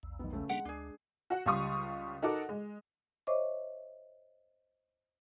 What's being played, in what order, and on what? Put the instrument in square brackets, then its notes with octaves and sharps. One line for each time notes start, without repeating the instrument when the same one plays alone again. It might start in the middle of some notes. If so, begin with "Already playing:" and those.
[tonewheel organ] A#1 E2
[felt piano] D#3 B3
C#2 A3 C#4
[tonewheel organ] G3 A#3 D4 [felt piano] G#3 [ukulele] F#5
[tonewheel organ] D2 [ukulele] D4 G#4
[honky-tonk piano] F#4 F#5
C#2 G3 F5 C6 C#6 D#6
D#4 F#4 A4 A#4 F#5 D6
G#3
[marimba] C5 C#5 D#5 E5 C#6 D6